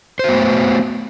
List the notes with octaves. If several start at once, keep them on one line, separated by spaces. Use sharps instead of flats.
A3 B3 F#4 C5